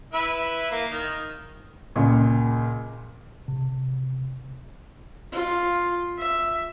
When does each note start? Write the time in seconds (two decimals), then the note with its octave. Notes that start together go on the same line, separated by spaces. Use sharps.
0.13 E4 B4 E5
0.71 A#3
0.91 D#3
1.96 C#2 A#2
3.48 C3
5.32 F4
6.17 E5